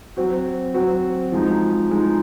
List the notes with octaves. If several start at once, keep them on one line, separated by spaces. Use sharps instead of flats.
F#3 C4 F#4
F#3 C4 F#4
F3 G#3 D#4
F3 G#3 D#4